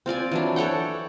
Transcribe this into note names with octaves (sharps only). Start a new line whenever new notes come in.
C4 F4 D5 G#5
E3 F#3 D4
A4 C#5 F#5 G5